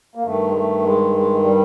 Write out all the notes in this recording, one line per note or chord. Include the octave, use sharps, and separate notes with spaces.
A#3
G2 D#3 A3
G#3
A3
G#3
G#3
G#3
G3